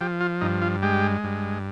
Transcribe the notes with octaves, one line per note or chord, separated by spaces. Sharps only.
F3 G4
F4
G2 D#4
F4
G#3 G4
G2